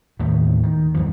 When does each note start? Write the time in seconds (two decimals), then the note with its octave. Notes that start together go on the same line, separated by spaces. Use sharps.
0.19 D#2 A2 D#3 E3
0.63 D#3
0.94 E2 G2 E3 F3